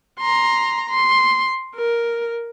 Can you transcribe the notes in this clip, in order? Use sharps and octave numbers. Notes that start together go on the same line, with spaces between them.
A#5 C6
C6
A#4